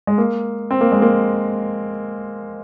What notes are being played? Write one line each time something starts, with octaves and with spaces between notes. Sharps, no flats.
G#3
A#3
C4
A#3
G#3
A#3